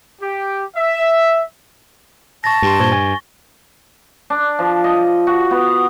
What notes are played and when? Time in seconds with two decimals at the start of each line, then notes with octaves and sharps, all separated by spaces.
0.22 G4
0.76 E5
2.44 A5 C#6 A6 A#6
2.62 G2 G4 C6
2.80 A#2 C5 C#6 G#6 G7
2.92 G#5
4.30 D4
4.59 F3
4.84 D#5
5.27 F#4
5.51 B3